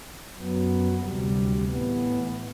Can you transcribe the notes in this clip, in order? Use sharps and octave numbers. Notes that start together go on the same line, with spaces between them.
F#2 F#3 B3
D2 C3 G3
A2 E3 B3